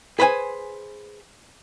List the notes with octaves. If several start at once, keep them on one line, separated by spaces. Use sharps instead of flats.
G#4 B4 C5 F#5 G#5